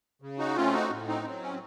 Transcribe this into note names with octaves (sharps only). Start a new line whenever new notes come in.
C#3
D#4 F#4
A3 C4 C#4 F4
D#4 F#4
A2
C4 D#4
F#3 C4
C#4